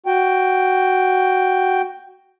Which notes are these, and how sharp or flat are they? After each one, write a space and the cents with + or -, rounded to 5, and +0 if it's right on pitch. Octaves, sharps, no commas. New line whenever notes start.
F#4 +10 G5 +0